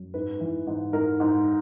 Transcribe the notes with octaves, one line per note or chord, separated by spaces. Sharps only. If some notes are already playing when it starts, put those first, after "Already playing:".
Already playing: F#2
G#2 B4
E3
G#2
G#2 A#4
G#2